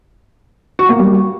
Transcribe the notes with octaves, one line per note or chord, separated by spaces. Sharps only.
F#4
A#3
G3